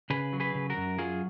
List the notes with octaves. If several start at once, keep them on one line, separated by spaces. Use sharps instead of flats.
C#3 G#4 B4
F#3
G#4 B4
C#3
F#4 A#4
F#2
F#3 F4 G#4